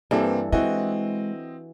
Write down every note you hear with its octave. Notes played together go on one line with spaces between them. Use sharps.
G2 E3 A#3 C4 A4
E3 G#3 C4 F#4 D#5